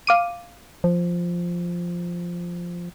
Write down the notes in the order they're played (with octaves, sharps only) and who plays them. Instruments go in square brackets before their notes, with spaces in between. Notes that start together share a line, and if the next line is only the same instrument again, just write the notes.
[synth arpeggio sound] F5 D6 D#7
[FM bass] F3